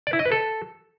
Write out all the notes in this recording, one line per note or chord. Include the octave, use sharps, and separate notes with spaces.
D5
E4
D#5
B4
A4